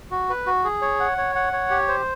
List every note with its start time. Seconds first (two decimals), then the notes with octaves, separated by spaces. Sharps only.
0.11 F#4
0.29 B4
0.47 F#4
0.64 G#4
0.82 C#5
1.00 F#5
1.18 C#5
1.35 F#5
1.53 C#5
1.70 G4
1.88 C5